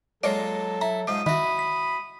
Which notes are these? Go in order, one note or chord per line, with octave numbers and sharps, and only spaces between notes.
F#3 G#3 A#3 F4 A4 C#5 D5
E4 A#5
G#2 F3 D#6
D#3 E4 F#4 B5
B6